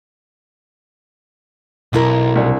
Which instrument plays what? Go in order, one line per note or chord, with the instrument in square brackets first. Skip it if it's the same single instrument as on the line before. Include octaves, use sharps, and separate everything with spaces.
[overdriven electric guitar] B1 [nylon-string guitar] C4 E4 A#4
[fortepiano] C2 D4